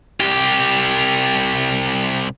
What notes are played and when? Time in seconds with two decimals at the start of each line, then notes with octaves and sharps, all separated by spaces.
0.20 C2 G4